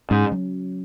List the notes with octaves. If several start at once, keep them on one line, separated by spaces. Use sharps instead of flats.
G#2 C#4
F#3